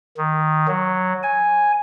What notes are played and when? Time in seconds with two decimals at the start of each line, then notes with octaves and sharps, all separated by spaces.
0.17 D#3
0.68 F#3
1.23 G#5